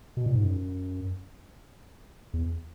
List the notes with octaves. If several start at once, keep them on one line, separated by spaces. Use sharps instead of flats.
B2
A#2
G#2
F#2
E2